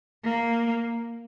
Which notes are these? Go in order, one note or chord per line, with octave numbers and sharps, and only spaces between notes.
A#3